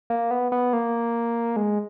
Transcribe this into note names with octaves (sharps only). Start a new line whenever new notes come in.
A#3
B3
B3
A#3
G#3